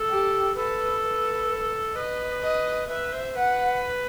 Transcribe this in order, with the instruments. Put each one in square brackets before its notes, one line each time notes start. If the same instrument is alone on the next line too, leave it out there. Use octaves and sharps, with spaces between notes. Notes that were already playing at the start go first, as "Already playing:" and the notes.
Already playing: [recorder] A4
[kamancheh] G4
[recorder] A4 [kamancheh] B4
[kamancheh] B4
[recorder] B4 [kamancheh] D#5
[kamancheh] D#5
[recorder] B4 [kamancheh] E5
[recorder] C5
[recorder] B4 [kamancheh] F#5